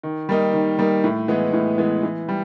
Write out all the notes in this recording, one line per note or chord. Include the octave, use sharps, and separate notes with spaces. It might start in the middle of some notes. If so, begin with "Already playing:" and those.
D#3
G3 A#3 D#4
D#3
G3 A#3 D#4
A2
E3 G#3 B3
A2
E3 G#3 B3
E3
G3